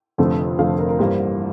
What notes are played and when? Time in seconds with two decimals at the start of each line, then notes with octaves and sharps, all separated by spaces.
0.18 F1 F2 D3 F3 A3
0.59 F1 F2 D3 F3 A3 F5
0.79 A#4
0.89 A#4
0.99 A1 G2 E3 G3 A#3 C5